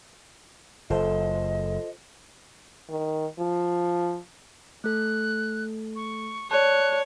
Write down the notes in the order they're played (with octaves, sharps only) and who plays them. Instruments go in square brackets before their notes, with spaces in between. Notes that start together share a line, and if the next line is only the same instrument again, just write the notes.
[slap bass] F#1 [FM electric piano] F4 A4 C5 [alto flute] D#5
[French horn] D#3
F3
[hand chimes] A3 A4 [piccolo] F#6
[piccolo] C#6
[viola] C#5 [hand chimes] D5 A5 [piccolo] F#6